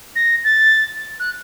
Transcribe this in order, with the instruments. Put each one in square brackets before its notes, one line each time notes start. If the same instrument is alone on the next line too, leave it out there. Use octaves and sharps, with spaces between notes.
[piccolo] A#6
A6
F#6